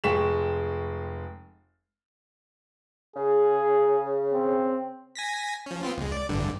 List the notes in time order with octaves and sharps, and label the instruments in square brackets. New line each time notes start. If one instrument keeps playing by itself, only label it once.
[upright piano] F1 G#3 G5 C#6 B6 E7
[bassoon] C#3 [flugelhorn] G#4
[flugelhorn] C4
[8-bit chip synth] G#5 A#6 B6
F3 C#4
B3 C4 F4
C#2 G#3
D5
A1 G2 D3